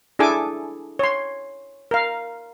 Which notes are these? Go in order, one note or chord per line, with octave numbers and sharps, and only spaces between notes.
D4 E4 G#4 A4 G#5 D6
C#5 C6
A#4 F5